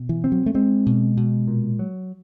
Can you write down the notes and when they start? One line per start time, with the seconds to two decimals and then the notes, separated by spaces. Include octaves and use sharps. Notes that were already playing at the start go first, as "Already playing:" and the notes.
Already playing: B2
0.09 E3
0.24 C4
0.32 F#3
0.46 A3
0.54 G#3 C4
0.86 B2
1.17 B2
1.47 A#2
1.79 F#3